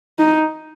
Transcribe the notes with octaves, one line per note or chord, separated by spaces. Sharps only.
D#4